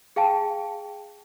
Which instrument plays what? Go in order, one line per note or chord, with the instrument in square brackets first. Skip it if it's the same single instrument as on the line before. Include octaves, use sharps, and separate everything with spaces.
[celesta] G#4 F5 G5 A5